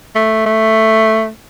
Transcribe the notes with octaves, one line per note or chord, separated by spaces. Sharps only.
A3
A3